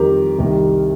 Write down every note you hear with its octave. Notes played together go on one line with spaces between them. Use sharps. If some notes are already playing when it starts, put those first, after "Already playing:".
Already playing: F2 D#3 G3 G4 A#4
C2 C3 D#3 G3